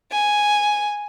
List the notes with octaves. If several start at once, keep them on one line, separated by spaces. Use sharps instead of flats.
G#5